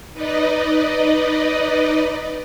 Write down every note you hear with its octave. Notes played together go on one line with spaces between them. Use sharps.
D#4 B4 D5 D#5